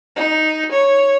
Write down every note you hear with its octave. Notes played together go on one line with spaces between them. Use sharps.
D#4
C#5